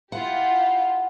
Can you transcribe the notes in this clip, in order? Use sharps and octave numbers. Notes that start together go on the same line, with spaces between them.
E4 F4 G4 F#5